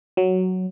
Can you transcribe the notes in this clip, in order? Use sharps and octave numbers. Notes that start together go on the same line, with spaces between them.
F#3